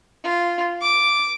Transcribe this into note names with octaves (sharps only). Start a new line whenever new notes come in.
F4
D6